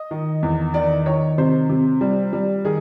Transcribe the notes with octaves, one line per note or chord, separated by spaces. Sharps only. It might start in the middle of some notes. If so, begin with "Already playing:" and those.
Already playing: D#5
D#3
E2
D#3 D5
D#3 C#5
C3 C5
C3
G3
G3
D#3 G#4